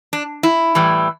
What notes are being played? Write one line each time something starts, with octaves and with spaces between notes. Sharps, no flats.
D4
E4
A2 E3 G3